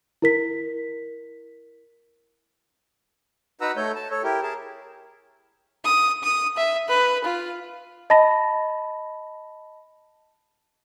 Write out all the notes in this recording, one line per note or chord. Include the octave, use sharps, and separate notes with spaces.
E4 A#4 B6
D#4 F#4 B4 F#5 A#5 E6
A3 A4 C#5 G6
A5
A4 C#5
E4 G4 A#4
G#4 A#4 A5
D#6
D#6
E5
B4
F4
D#5 A5 B5 A#6